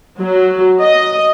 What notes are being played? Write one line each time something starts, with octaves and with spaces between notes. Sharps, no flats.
F#3
D#5